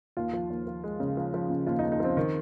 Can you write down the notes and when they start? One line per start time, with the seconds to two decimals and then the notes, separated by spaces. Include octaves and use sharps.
0.17 D#2 F4
0.33 F3
0.50 D#2
0.67 F3
0.84 G#3
1.00 C#3
1.17 F3
1.34 F3
1.50 C#3
1.67 D#2 F4
1.79 D#4
1.83 D#2
1.92 D#4
2.00 F3 C4
2.17 D#3